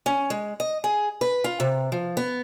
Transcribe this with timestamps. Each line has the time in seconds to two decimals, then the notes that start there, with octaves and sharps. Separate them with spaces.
0.06 C#4
0.30 G#3
0.60 D#5
0.84 G#4
1.21 B4
1.44 F4
1.60 C3
1.92 F3
2.17 B3